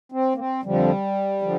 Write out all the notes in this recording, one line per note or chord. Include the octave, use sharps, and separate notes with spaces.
C4
A#3
C4
F2 D3 F3 G3
D3 F3